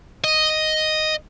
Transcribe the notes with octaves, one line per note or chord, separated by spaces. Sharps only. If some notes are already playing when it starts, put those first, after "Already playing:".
D#5